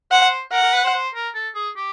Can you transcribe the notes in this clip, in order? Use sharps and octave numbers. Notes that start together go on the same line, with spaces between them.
C5 F#5
A#4 F#5
A#4
B4
C5
C5
A#4
A4
G#4
G4